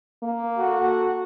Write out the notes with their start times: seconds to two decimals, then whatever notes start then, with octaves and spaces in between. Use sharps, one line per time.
0.23 A#3
0.59 F#4 A4 F#5